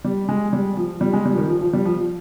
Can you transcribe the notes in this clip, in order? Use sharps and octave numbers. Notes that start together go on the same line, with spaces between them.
G3
G#3
G3
F3
G3
G#3
G3
F3
D#3
F3
F3
G3
F3